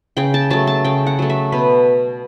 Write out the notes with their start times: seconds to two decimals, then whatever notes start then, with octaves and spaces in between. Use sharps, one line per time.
0.17 C#3 G5
0.34 A5
0.50 F#3 A3 A5
0.67 A5
0.85 C#3 G5
1.07 F#5
1.19 F#3 A3
1.30 E5
1.52 B2 B4